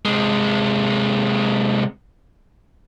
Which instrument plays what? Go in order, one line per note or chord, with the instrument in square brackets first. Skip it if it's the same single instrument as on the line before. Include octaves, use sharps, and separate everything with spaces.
[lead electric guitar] C3 G#3